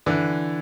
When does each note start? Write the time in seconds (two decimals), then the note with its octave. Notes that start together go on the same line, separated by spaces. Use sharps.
0.06 D3 E3